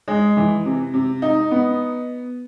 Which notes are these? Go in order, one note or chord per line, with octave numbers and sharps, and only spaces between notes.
G#3
E3
C3
C3
D#4
B3